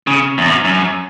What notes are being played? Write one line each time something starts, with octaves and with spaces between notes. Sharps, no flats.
C#3
E2
F#2
F#2